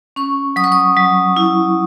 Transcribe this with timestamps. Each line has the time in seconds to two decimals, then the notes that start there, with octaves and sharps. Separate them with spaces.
0.16 C#4 C#6
0.56 F#3 D#6
0.64 C#6
0.72 D#6
0.97 F#3
1.36 E4